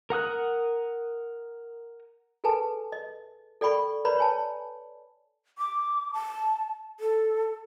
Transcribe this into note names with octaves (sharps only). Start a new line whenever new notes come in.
A#4 F#5 D#6 F#6
G#4 A4 B4 G#5 A5
D#5
A4 D5 G5 B5 C#6
B4 C#5 D5 A#5 B5
C#5 G#5 A5
D6
A5
A4